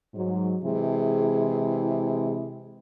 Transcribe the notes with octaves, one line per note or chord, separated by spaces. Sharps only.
G#2 F#3
C3 E3 G#3 E4 G#4